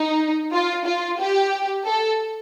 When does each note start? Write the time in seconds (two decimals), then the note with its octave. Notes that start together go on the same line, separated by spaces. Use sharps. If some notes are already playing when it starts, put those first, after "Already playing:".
Already playing: D#4
0.53 F4
0.86 F4
1.19 G4
1.85 A4